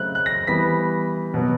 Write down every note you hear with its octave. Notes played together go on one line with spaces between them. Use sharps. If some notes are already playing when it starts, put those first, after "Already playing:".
Already playing: C#3 F#3 A3 C4 F#6
F#6
A#6
E3 G3 B3 B6
B2 F#3 B3